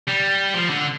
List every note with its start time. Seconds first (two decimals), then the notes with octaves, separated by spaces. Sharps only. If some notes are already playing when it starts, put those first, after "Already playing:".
0.08 G3
0.54 F3
0.70 D3